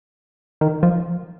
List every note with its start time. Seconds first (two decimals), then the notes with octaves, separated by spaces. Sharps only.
0.61 D#3
0.83 F3